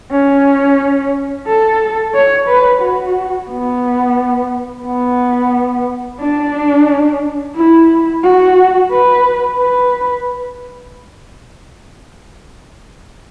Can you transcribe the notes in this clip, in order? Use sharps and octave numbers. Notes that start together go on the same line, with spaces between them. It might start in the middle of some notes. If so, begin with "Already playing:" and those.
C#4
A4
C#5
B4
F#4
B3
B3
D4
E4
F#4
B4
B4